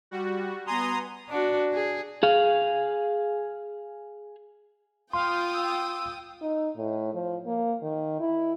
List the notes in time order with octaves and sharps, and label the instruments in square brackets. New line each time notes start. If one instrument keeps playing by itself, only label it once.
[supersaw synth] G3 F#4
[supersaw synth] B3 G#5 [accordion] A#5 C6 D#6
[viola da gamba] D4 F#4
G#4
[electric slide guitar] G#4 F5
[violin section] F4 G5 D#6 [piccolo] F5 [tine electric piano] C6
[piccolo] E6
[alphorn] D#4
A2
F3
A#3
D#3
E4